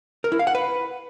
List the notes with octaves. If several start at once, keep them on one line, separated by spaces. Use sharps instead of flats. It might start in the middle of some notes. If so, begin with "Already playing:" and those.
A#4
E4
F5
F#5
B4